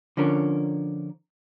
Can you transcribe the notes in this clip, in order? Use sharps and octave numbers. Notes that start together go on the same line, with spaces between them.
D3 F3 C#4 A#4